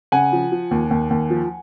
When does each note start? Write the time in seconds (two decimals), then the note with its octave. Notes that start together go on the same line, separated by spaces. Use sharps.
0.12 C#3 F#5 G#5
0.32 F3
0.52 F3
0.71 D#2
0.91 D#2
1.10 D#2
1.30 F3